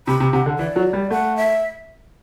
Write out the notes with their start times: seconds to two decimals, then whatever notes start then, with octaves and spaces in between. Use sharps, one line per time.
0.07 C3 B5
0.20 C3
0.33 C3 F#5
0.46 D3
0.59 E3 D5
0.76 F#3
0.93 G3
1.10 A3 F#5
1.36 E5